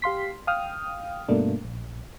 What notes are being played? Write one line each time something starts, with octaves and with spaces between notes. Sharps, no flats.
G4 F5 C6 B6
F5 G5 D#6 F6
G2 B2 A3 A#3 D4
A#1